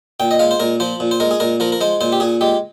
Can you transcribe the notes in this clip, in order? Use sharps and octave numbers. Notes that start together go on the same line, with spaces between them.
A#2 G5
D#5
G#3 F5
C5
A#2 A#4
F3 C5
A#2
C5
G#3 A#4
G#4
A#2 A#4
F3 A#4
A#4
G#3 C5
A#2 C5
G4
A#2 G#4
G#3 G4